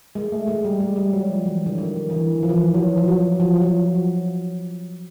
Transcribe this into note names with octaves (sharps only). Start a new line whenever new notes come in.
G#3
A3
G#3
G3
G#3
G3
F#3
F3
E3
D3
D#3
E3
F3
E3
F3
F#3
F3
F#3
F3
F3
F#3